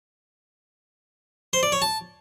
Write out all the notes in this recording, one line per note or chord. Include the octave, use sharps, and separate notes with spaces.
C5
D5
C#5
A5